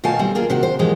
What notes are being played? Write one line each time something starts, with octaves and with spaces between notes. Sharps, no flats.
B2 D#3 A3 F5 G#5 A5
G3 C4
A#3 F4 G#4 A#4
C3 D#3 F#4
C5
F2 B2 D#3 E3 G#3 G4